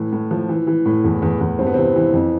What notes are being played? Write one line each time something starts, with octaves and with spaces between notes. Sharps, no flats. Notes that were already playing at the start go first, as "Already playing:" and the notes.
Already playing: A2 E3
A2
F3
E3
E3
A2
E2
E2
E2
G2 C4
B3
C3 E3 C4
E3
F2